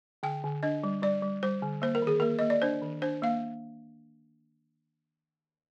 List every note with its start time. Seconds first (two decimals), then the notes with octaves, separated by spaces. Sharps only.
0.23 D3 G5
0.44 D3
0.63 D4 D#5
0.83 G3
1.03 G3 D5
1.22 G3
1.43 G3 C5
1.62 D3
1.82 A#3 C5
1.95 A#4
2.02 D#3 G#4
2.20 A#3 A#4
2.39 A#3 D#5
2.50 D5
2.62 D4 C5
2.82 D#3
3.02 D4 C5
3.22 A#3 F5